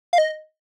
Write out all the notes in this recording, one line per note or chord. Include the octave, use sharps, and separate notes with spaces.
F5
D#5